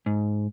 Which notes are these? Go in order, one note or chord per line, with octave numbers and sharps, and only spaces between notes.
G#2